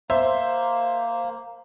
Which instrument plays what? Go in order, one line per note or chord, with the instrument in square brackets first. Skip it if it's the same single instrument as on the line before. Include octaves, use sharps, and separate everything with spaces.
[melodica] A#3 [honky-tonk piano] C5 E5